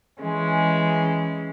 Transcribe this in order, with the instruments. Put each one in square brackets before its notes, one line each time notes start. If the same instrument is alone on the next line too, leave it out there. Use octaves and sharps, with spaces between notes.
[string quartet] E3 G#3 C#4